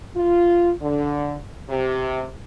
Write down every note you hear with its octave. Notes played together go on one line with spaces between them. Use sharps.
F4
D3
C3